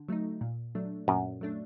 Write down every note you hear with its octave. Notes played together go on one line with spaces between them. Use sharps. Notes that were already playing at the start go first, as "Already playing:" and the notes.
Already playing: D3
F#3 A3 D#4
A#2
F#3 A3 D4
F#2 A#2
F#3 A3 D4